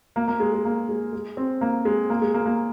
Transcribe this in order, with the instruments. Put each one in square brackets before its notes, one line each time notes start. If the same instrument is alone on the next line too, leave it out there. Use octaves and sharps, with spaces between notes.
[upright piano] A#3
A#3
G#3
G#3
A#3
G#3
G#3
C4
A#3
G#3
A#3
G#3
A#3
A#3